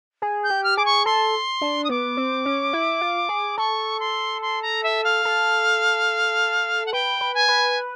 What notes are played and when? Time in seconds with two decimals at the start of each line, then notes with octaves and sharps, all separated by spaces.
0.22 G#4
0.43 G6
0.50 G4
0.63 F6
0.77 G#4 D6
0.85 C#6
1.05 A4 C6
1.61 D4
1.84 D#6
1.89 B3 D6
2.17 C4
2.45 C#4
2.73 E4
3.01 F4
3.29 G#4
3.58 A4 C#6
3.99 C6
4.41 C6
4.62 A#5
4.83 E5
5.04 F5
5.25 A4
6.86 F#5
6.93 B4 G5
7.21 B4
7.34 G#5
7.48 B4